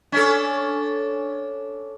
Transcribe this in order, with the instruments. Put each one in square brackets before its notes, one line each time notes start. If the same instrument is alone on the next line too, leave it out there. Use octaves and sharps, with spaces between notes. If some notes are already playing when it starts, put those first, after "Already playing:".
[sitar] C#4 D4 A4